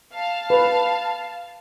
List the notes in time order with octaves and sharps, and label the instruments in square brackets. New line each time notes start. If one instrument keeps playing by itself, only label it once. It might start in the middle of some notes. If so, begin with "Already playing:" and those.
[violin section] F5 A5
[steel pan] B4